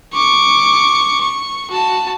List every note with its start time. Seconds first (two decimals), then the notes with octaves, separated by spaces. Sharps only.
0.13 C#6 D6
1.21 C#6
1.71 F#4 A5